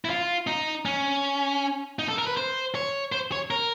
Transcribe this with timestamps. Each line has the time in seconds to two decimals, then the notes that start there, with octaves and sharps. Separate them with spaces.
0.05 E4
0.10 F4
0.47 D#4
0.85 C#4
1.99 D#4
2.08 A4
2.18 A#4
2.27 B4
2.37 C5
2.75 C#5
3.12 C5
3.32 C#5
3.51 A#4